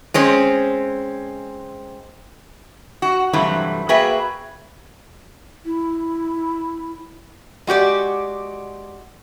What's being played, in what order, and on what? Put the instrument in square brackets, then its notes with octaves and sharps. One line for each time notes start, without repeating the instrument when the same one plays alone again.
[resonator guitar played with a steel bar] G#3 C4 C#4
F#4
G2 C3 E3 F#3 A3
A#3 F#4 G#4 B4 E5 G5
[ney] E4
[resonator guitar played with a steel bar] G#3 F#4 G4 D5